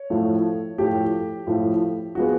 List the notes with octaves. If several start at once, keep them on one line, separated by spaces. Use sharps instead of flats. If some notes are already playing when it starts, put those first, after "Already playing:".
Already playing: C#5
A2 F3 A3
A2 F3 A3 G4
A2 F3 A3
F3 G#3 B3 F#4